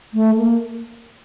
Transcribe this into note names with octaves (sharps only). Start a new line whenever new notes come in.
A3
A#3